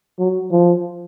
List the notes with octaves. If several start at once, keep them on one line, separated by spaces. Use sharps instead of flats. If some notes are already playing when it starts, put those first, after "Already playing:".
F#3
F3